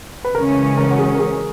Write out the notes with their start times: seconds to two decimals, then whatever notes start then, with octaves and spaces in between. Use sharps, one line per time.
0.25 B4
0.35 C#3 E3 G#3 C#4 A#4
0.77 A#4
0.91 F#4
0.99 G#4
1.14 A#4
1.19 G#4